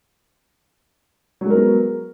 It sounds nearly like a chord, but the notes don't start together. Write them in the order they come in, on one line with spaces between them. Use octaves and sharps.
F#3 G#3 A#4 B3